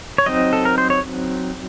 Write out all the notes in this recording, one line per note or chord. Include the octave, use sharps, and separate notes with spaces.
C#5
F#3 C4 D#4 D#5
A4
A#4
C5
C#5